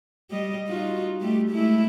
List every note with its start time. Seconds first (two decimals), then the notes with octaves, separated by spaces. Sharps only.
0.30 G3 D#5
0.68 D#4 F4 F#4
1.21 G3 A3 G4
1.49 G#3 A3 E4